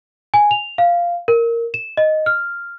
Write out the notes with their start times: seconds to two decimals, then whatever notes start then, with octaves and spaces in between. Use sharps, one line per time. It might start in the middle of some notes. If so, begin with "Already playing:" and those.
0.34 G#5
0.51 F7
0.78 F5
1.28 A#4
1.74 E7
1.97 D#5
2.26 F6